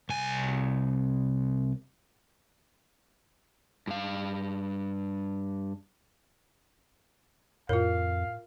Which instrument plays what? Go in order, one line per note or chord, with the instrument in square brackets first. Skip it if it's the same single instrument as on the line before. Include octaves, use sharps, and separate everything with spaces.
[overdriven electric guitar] C2 G#5
G2 F5
[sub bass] F2 [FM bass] A2 [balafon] F4 A#4 [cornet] F5